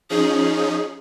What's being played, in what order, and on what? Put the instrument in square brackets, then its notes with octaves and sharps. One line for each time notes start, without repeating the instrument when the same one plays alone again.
[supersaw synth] F3 C#4 D#4 [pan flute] G#4